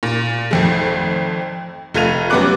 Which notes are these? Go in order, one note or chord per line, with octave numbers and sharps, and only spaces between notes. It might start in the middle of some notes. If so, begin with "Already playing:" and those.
A#2
G#1 F2 A3
F1 A3 F4 G#6 D#7 F7
F#2 G3 B3 C#5 D6 F#6